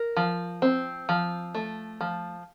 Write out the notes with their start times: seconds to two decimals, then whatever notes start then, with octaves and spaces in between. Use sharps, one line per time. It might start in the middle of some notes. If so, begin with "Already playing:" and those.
Already playing: A#4
0.17 F3
0.62 C4
1.09 F3
1.55 A3
2.01 F3